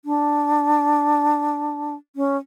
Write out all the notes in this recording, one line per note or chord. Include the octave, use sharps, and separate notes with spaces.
D4
C#4